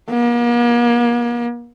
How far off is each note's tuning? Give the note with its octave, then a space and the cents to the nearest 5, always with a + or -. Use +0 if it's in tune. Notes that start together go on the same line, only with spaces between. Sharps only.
A#3 +40